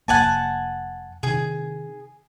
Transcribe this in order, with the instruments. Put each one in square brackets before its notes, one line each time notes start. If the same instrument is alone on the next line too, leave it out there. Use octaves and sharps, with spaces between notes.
[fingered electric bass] F1 E2 A#3 [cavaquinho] F#5 G#5 A5
[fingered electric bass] C3 D#3 [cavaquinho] G#4